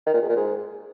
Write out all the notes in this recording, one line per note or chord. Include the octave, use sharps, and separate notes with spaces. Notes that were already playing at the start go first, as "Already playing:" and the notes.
D#3
A#2
E2
A#2
G#2